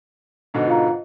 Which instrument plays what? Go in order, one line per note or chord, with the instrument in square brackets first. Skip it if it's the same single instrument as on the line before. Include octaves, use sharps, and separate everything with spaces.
[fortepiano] G#2 B2 D3
[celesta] F4 F5 A#5